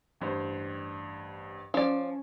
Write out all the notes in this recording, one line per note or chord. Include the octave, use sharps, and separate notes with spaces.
A1 G2 C5
F3 C#4 D5